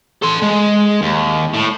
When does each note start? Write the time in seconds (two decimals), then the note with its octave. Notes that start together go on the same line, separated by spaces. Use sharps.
0.23 A4 C6
0.43 G#3
1.02 D#2
1.54 A2